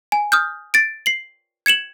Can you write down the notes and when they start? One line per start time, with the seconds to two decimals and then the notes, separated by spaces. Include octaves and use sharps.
0.12 G#5
0.32 D#6 F6 G6
0.74 A6 D7
1.06 C7 F#7
1.66 G#6 C#7 E7 F#7